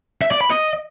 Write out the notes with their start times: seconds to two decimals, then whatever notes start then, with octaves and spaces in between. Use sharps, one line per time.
0.22 E5
0.31 D5
0.41 B5
0.50 D#5